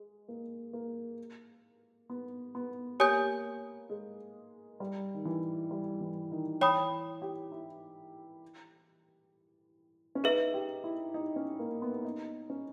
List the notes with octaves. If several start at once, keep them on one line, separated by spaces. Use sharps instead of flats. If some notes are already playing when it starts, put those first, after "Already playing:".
Already playing: G#3
A#3
A#3
B3
B3
A#3 G4 C#5 G#5 D#6 G6
G#3
G3
D#3
E3
G3
E3
D#3
E3 C#5 G5 B5 D#6
G4
E4
C#4
D#4 G#4 B4 E5
G4
E4
D#4
C#4
A#3
B3
D#4
C#4